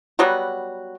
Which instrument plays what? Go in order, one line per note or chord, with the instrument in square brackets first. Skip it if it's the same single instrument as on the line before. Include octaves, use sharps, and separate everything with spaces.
[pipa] F#3 G3 B3 F#4